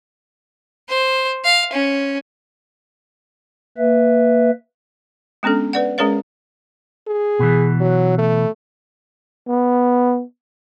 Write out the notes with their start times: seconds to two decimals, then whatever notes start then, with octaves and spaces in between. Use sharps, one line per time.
0.89 C5
1.44 F5
1.73 C#4
3.78 A#3 B4 E5
5.43 G#3 B3 C#4 D4 A4
5.73 B4 D5 F#5
5.98 G#3 C#4 G#4 A#4 C#5 F5
7.07 G#4
7.39 B2 E3
7.80 F#3
8.18 A3
9.48 B3